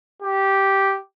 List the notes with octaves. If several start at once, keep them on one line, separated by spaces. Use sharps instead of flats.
G4